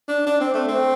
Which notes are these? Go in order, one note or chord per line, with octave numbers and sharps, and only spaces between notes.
D4
D4
C4
A3
C4